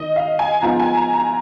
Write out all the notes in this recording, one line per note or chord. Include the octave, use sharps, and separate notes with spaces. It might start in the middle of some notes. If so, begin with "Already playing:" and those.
Already playing: D#3 D#5
F5
G#5
G#2 F3 B3 F4 A#5
G#5
A#5
A#5